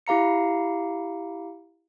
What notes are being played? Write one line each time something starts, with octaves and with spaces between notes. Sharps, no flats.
E4 G4 F5 A#5 C#7